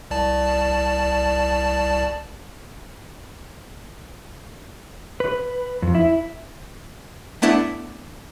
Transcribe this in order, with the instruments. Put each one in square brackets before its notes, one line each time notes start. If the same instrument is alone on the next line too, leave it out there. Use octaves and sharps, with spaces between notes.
[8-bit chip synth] C2 D5 A5
[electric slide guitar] B4
F2
E4
[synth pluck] A3 B3 D4 E4